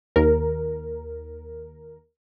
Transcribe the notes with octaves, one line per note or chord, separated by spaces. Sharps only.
D#2 A#4